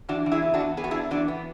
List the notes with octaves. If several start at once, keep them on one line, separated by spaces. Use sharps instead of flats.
E3 D4 F#4
E3
E4 G#4
B3
D4 F#4
E3
B3 G#4
F#4
E4 G#4
D4
E3 D4 F#4
B3